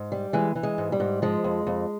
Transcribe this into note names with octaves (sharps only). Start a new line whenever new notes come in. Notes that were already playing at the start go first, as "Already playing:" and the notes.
Already playing: G#2
G3
E3 G#3
E3
G#3
G#2
G3
G#2
F3 G#3
F2
F2